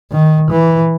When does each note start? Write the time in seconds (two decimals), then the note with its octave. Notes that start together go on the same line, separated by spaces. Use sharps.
0.11 D#3
0.51 E3